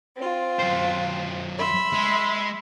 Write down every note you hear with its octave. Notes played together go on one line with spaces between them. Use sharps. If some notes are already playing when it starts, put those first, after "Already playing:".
C4 F4
F#2 C5
E5 B5 C6
G#3